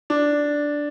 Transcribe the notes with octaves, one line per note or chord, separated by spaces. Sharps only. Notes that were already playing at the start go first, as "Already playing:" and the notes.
D4